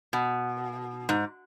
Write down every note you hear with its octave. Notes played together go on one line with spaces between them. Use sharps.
B2
G#2